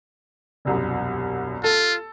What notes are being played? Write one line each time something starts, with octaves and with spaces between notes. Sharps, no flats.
E1 C2 F#2
F4 A4